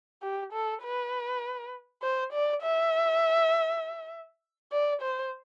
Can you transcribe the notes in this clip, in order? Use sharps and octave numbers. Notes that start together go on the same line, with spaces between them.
G4
A4
B4
C5
D5
E5
D5
C5